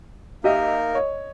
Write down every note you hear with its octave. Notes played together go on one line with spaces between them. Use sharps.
A#3 D#4 G4 A#4 D#5 E5
C#5 D#5